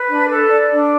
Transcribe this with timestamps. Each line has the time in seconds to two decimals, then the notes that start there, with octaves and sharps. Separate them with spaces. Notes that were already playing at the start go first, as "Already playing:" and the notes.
Already playing: B4
0.08 D4
0.29 A4
0.50 D5
0.71 D4